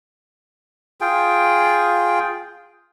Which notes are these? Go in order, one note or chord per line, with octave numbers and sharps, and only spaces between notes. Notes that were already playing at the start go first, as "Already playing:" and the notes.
F4 G#4 G5